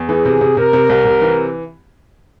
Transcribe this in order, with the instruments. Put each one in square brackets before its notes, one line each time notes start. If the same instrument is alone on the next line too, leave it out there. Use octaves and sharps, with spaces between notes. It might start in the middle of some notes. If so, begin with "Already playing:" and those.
Already playing: [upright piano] E2
[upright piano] E3 [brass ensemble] G#4
[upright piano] C3
C3
[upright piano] C3 [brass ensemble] A#4
[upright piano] C3
C2
C3
E3